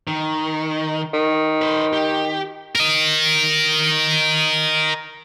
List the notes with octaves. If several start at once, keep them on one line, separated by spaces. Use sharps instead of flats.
D#3
D#3
B4 C5
G4
A#4 D#5